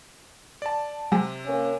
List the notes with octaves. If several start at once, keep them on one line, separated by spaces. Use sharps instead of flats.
D5 A5
C3 F#3 G#3
A#3 C#4